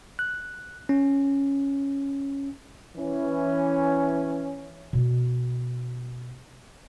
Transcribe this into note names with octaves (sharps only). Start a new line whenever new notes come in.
F#6
C#4
E3 C#4
B2 B3